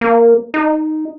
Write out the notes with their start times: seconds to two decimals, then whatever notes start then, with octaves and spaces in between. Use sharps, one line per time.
0.01 A#3
0.54 D#4